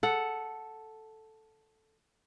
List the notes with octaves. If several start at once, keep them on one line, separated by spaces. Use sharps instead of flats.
A4 F#5